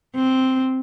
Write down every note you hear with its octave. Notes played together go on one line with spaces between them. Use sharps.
C4